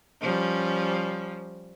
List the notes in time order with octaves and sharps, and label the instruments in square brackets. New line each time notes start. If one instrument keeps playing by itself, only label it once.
[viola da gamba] F3 G3 C#4